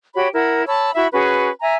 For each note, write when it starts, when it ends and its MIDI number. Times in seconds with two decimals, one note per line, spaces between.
0.14 0.28 66
0.14 0.28 67
0.14 0.28 73
0.14 0.28 83
0.34 0.64 64
0.34 0.64 70
0.34 0.64 78
0.67 0.91 73
0.67 0.91 81
0.67 0.91 83
0.67 0.91 88
0.95 1.07 64
0.95 1.07 66
0.95 1.07 76
0.95 1.07 83
1.13 1.50 61
1.13 1.50 66
1.13 1.50 68
1.13 1.50 71
1.61 1.75 76
1.61 1.75 80
1.61 1.75 82